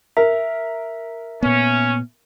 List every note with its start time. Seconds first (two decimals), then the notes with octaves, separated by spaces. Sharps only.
0.17 A#4 E5
1.43 A#2 B3 C#4